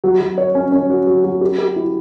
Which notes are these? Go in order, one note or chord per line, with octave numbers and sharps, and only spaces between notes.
F#3
F#3
C#5
C#4
C#4
F#4
F#3
F#3
G4
G4
E4